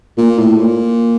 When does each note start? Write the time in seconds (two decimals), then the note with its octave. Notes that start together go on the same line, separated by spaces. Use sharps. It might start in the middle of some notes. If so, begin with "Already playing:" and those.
0.18 A#2
0.38 A2
0.58 A#2